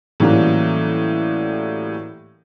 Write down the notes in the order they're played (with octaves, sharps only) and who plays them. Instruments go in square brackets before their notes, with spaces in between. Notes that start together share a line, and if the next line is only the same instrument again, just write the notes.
[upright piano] A2 E3 F#3 G3 A#3 C#4